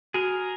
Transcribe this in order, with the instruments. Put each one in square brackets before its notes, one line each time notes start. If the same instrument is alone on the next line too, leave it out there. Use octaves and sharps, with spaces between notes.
[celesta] F#4 [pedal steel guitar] G#4 A#4